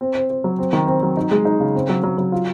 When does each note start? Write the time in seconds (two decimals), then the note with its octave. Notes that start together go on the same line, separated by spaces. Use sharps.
0.01 C4
0.15 C5
0.30 C5
0.44 F#3
0.59 C4
0.73 D#3
0.87 C4
1.03 F#3
1.17 D#4
1.31 G#3
1.45 D#4
1.60 C#3
1.75 C4
1.89 F#3
2.04 F#3
2.18 F#3
2.32 F4